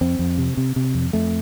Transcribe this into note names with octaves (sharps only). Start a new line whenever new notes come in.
F2 C4
F2
C3
C3
C3
F2
F2 A3